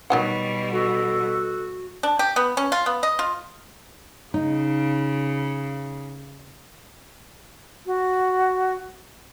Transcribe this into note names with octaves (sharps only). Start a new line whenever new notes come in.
B2 D#3 F#3 G3 F#5
F#4 A4
D4
G4
B3
C#4
F4
B3
D#5
F4
C#3 D#4
F#4